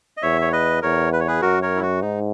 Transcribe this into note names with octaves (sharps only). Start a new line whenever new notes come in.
D#5
E2 C#5 E5
C#5
B4 D#5
E2 A#4 C#5
B4
C#5
G#4 B4
F#2 F#4 A#4
A#4 C#5
E4
F#4
G#2 D#4